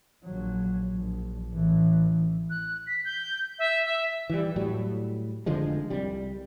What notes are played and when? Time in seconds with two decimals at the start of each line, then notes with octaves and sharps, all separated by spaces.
0.24 A#1 F#3
0.95 A#1
1.54 A1 E3
2.50 F#6
2.87 B6
3.05 G6
3.59 E5
3.85 E5
4.30 E3 G3
4.56 A2 F#3 G3
5.46 F1 D3 F3 G#3
5.90 C2 G3